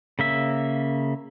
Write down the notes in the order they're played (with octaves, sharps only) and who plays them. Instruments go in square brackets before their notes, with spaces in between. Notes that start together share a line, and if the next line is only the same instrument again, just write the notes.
[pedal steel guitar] C#3 A#3 E5